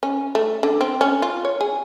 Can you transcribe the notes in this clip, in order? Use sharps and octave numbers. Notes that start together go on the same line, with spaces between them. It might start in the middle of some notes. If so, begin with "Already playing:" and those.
C#4
A3
D3
C4
C#4
F4
C#5
G#4